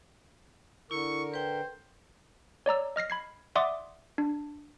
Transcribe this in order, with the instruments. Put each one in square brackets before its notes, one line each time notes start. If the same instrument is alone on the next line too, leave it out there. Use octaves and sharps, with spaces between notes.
[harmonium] D3 A#4 [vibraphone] E4 [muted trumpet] C#6
[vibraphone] B4 G5 [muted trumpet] C5
[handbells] C#5 D5 A#5 E6
D#5 F6 A#6 C7
B5 G#6 C7
D5 E5 F#5 C6 D6 D#6
D4